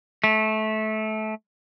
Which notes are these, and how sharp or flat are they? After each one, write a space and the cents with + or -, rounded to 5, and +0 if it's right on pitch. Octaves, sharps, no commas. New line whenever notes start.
A3 -20